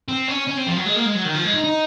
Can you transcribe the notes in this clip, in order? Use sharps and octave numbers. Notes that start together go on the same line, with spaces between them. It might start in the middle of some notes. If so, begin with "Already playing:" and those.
C4
C#4
C#4
C4
F3
F#3
G#3
A#3
G#3
F#3
D#3
F3
G#3
D#4
D#4